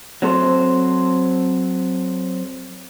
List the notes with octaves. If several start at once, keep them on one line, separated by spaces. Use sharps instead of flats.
F#3 C4 A4 C5